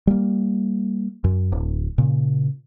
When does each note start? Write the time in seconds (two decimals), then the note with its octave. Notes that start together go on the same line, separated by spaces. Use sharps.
0.07 G3 A#3
1.24 F#2
1.52 D1
1.98 A#2 C#3